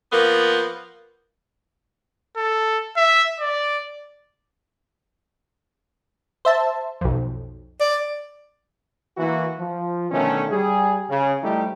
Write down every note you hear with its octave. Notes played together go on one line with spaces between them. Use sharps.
F3 A#3 B3
A4
E5
D5
C5 E5 A5
B1 F2
D5
E3 A#3 F#4
F3
B2 D3 D#3 A3 C#4
G3 G#4
C#3
F3 G3 A3 D#4 E4 G4